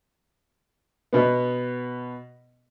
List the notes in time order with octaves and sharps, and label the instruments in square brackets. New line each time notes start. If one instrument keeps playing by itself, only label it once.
[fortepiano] B2 B3